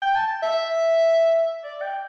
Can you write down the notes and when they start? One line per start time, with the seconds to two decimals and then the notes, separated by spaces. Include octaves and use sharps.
0.02 G5
0.15 A5
0.43 E5
1.64 D5
1.82 G5